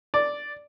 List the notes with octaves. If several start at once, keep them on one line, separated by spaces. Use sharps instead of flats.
D5